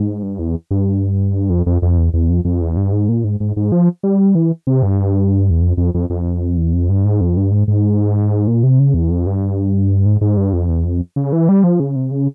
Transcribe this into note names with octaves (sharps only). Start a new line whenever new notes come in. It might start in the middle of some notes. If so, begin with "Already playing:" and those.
Already playing: G#2
G2
E2
G2
F2
F2
F2
E2
E2
F2
F2
E2
G2
G#2
A#2
G#2
G#2
G#2
F3
G3
E3
C3
G2
E2
F2
F2
F2
F2
E2
F2
G2
G#2
F2
G2
G#2
G#2
A#2
C3
C#3
E2
F2
G2
G#2
G#2
G2
F2
E2
F2
C#3
E3
G3
F3
C#3
C3
C#3